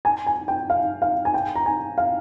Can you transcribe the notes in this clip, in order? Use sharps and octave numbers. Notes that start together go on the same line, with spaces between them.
G#5
G#5
G5
F5
F5
G#5
G5
A#5
G#5
F5